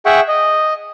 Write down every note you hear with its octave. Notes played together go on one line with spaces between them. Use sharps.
G#4 E5 F#5 G5 C#6
D#5